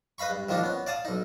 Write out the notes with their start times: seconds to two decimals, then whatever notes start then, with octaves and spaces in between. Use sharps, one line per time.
0.18 B4 D#5 F5 B5 C#6
0.30 G2
0.49 D#3 F3 A#3 D4 D#4
0.63 B3 C#4
0.87 D5 F5 A5 D#6
1.05 B1 D#4